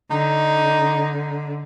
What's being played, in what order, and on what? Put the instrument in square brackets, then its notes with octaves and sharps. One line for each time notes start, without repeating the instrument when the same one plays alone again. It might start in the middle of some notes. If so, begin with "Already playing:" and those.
[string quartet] D3 [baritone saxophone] D#4